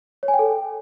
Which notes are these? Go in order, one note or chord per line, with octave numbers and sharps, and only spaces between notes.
C#5
G#5
G5
A4